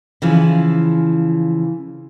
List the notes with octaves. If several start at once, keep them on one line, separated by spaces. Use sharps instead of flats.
C#3 E3 F3